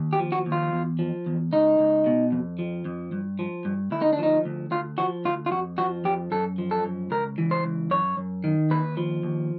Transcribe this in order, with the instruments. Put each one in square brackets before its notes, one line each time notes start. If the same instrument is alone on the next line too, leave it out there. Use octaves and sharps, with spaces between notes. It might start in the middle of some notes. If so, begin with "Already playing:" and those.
Already playing: [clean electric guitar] D#2
G4
F3
F#4
D#2
F4
E2
F3
E2
C#2 D#4
C#2
B2
F2
F3
F2
G2
F3
G2
D2 E4
D#4
D4
F3 D#4
D2
D2 F4
F3 F#4
D2 F4
F4
F2 F#4
F3 F#4
F2 G4
F#2 A4
F3
A4
F#2
C#2 A#4
E3
C5
C#2
F#2 C#5
F#2
D#3
D#2 B4
F3
D#2